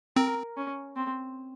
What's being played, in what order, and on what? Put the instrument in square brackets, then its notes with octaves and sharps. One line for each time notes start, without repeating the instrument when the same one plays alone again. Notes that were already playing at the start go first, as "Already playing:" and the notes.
[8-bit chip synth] C4 [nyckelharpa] A#4
[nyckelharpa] C#4
C4